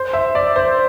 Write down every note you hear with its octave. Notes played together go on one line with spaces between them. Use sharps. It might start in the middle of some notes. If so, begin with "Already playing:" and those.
Already playing: C5
E5
D5
C5